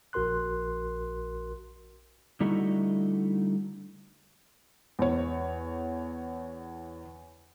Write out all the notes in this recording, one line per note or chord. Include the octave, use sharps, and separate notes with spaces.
A#1 F#4 A#4 C6 F#6
D3 G3 A3 D#4 E4 F#4
E2 C#5